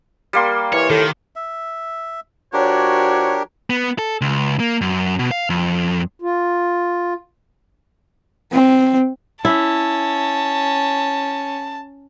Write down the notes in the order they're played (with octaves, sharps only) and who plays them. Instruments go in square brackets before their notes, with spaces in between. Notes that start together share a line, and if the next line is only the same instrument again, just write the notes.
[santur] G3 A#3 C6
[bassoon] E3 [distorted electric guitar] C#5
[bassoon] A2 [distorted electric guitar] D#3
[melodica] E5
[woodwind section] F3 F#4 C#5 [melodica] D4 G4 A#4
[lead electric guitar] B3
A4
C#2
A#3
F#2
B2
F5
F2
[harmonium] F4
[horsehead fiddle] C4
[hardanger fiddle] C#4 [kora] E4 [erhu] A5